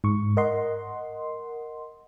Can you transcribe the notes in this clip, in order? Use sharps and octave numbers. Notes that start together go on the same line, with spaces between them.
G#2 C#6
A#4 D#5 F#5 C6